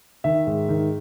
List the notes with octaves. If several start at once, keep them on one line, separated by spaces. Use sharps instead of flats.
D#3 E5
G#2
D#3